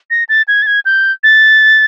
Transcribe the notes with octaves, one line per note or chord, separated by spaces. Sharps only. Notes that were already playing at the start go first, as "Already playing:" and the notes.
A#6
A6
G#6
A6
G#6
G6
A6